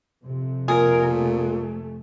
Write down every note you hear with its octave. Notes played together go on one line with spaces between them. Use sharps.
F2 C3
A#2 G#4 A#4
A3